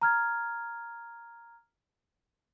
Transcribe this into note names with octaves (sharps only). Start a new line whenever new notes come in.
A#5 F6 G#6